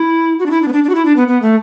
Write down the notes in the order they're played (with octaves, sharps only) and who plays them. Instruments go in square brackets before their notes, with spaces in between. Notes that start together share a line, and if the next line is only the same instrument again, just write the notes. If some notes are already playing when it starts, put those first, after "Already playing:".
Already playing: [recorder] E4
F#4
D4
E4
D4
B3
D4
D4
F#4
E4
D4
B3
B3
A3